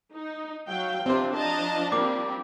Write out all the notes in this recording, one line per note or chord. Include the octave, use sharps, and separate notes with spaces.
D#4
F#3 F5 G5
C3 F3 C4 D4 F4 C5
D#5 A5 A#5
G3 A#3 C4 D6